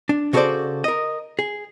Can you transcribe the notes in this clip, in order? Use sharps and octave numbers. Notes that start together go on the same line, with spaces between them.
D4
C#3 F#4 A4 A#4 C5 D5
A#4 D#5
G#4